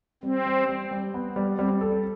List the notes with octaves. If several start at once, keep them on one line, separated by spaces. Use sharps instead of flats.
G3 C4
G3
G3
G3
B3
G3
G3 C4
A4